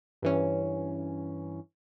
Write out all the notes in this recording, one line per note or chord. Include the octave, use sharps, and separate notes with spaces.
G2 E3 C#4